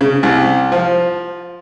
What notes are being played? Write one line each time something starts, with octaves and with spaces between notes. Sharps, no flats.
C#3
C2
F3